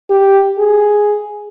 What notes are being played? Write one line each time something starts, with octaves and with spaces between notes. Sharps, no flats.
G4
G#4